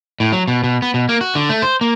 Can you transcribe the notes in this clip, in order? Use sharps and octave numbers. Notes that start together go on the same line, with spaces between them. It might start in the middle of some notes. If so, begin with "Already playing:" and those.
A2
F#3
B2
B2
B3
B2
A#3
F#4
D3
A3
C5
A#3